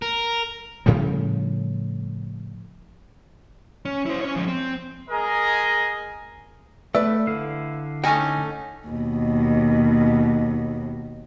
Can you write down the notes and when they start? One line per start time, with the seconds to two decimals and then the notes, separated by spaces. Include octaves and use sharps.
0.02 A#4
0.86 A2 C#3 F3 G3
3.85 C#4
4.06 E4 C5
4.21 C#4 C#5
4.36 F3 G#3
4.48 C4
5.10 G#3 G#4 A#4 D#5 G#5 A#5
6.95 A3 B4 D5 E5
7.27 D3 E4 F5
8.04 A3 C#4 D#4 G5 G#5
8.87 D#2 B2